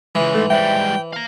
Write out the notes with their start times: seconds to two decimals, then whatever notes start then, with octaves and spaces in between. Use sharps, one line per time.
0.15 C#3 E3 G#3
0.34 G#2 A3
0.50 G#2 G3 C5 E5 G5
1.13 F5 A#5